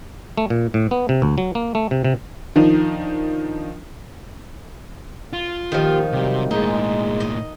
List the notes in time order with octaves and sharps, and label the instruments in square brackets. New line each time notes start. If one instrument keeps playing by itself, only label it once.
[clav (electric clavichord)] A3
A#2
A2
B3
C3
D2
F#3
A#3
A3
C3
C3
[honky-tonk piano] D#3 F3 D4 D#4
[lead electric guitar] F4
[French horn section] A#2 G4 [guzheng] D#3 F3
[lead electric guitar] C3 [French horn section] F#3 G3
[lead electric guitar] A2 A#3 [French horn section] G#3 [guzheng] D#4
[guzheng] D#5